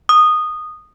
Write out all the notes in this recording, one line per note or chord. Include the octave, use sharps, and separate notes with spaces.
D#6